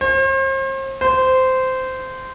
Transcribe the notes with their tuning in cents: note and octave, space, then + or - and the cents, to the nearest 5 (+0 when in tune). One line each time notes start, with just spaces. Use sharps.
C5 +40
C5 -15